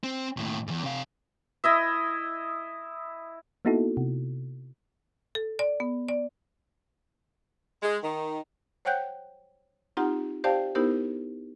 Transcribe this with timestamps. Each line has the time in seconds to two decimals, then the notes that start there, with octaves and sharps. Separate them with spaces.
0.04 C4
0.37 D#2 A2
0.67 E2 G#2
0.84 C3 F5
1.64 E4 D#5 E5
3.65 A#3 B3 D#4 E4 F#4 A4
3.97 C3
5.35 A4
5.59 D5
5.80 B3
6.09 D5
7.81 G#3
8.02 D#3
8.85 C5 C#5 F#5 G5 F#6 G6
9.97 C4 D#4 F4 G4 F#5 A#5
10.44 G4 C5 D5 F5 G5 A5
10.75 B3 D#4 E4 G4 A#4 C5